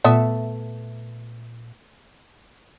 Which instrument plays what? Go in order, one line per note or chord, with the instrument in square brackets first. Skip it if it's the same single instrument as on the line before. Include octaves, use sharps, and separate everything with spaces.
[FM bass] A#2 [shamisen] A3 B3 E5